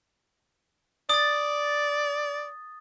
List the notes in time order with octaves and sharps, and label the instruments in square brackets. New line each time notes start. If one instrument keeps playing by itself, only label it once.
[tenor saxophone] D5 [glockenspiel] D#6 A6